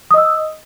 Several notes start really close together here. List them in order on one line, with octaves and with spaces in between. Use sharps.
D#6 D#5 E6